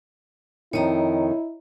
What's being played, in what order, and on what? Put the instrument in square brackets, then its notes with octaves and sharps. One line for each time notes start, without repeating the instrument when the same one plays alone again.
[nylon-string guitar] F2 D#3 [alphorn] E4 [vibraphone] C#5 D#5 A#5